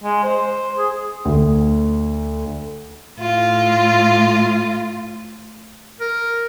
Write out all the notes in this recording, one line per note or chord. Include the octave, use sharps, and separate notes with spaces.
G#3
C5
G#4
D2
A2 F4
A#4